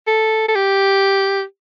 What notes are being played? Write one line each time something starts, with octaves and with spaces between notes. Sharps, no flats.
A4
A4
G4